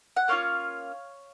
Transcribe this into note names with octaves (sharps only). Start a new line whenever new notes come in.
F#5
A#3 C#4 F4 C#5 F5